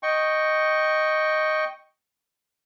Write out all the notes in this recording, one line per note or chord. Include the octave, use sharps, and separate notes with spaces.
D#5 G5 C#6